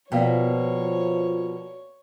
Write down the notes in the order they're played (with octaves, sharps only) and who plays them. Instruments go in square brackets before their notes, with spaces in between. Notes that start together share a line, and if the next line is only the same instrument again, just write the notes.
[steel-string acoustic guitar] B2 A#3 [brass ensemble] F3 [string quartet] C#5 [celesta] D5 F5 G5